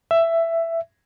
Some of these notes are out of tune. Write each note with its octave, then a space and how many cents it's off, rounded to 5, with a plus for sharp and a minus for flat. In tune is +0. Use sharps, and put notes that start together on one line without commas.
E5 +10